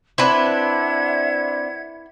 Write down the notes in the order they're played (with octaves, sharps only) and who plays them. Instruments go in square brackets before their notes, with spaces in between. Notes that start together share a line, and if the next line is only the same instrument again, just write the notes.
[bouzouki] C4 D4 [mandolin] E4 B4 [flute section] E5 F#5 G#6